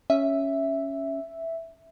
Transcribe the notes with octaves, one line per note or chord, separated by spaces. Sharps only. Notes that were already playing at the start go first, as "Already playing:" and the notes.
C#4 E5